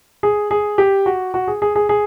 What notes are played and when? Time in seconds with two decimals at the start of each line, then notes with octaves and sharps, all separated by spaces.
0.23 G#4
0.51 G#4
0.78 G4
1.06 F#4
1.34 F#4
1.48 G#4
1.62 G#4
1.76 G#4
1.89 G#4